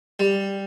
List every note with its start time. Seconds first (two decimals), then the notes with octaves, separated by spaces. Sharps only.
0.19 G3